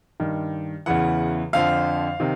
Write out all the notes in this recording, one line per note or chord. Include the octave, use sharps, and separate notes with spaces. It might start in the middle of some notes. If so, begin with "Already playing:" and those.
G2 D#3
E2 C#3 E3 F#5
F2 D3 F3 F5
C3 D#3